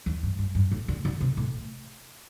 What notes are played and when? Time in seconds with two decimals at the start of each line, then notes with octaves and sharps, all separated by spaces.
0.06 E2
0.23 G2
0.39 G2
0.55 G2
0.71 A2
0.88 D3
1.05 D3
1.21 C3
1.37 A2